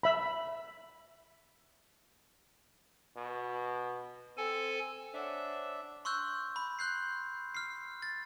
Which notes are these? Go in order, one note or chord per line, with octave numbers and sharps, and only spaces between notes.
E5 B5
B2
C4 A4 G#5
D4 C5 C#5 E5 F#5
C6 C#6 E6 F#6 G6
B5
C6 F#6 G6 C7
F6 C7
A6